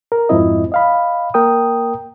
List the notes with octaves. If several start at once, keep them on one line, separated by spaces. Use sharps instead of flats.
A#4
F2 G#2 F3 C4 E4 D#5
D#5 F5 B5
A#3 A#4 G5 D#6